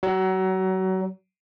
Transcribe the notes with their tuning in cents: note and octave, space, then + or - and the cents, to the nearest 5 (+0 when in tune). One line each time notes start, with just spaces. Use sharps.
F#3 +30